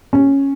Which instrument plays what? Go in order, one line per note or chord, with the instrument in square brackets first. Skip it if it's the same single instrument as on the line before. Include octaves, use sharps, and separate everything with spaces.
[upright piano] C#4